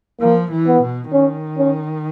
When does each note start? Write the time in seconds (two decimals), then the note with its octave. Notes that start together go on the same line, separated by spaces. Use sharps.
0.21 F3 A#3
0.51 E3
0.67 B3
0.82 B2
1.12 D#3 C#4
1.58 C#4